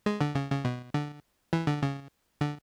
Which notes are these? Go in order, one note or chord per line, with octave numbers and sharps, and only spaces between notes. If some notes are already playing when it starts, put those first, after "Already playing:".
G#3
D3
C#3
C#3
B2
D3
E3
D3
C#3
D3